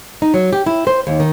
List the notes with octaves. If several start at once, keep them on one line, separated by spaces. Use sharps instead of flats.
D#4
F#3
G4
E4
C5
D#2
D#3